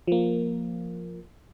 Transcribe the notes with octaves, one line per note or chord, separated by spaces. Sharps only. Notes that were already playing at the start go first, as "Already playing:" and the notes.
F3 A#3